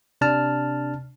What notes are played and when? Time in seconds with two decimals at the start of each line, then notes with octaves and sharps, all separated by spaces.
0.21 C3 D4 A5 F6